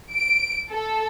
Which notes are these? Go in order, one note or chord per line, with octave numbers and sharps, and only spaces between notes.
D7
A4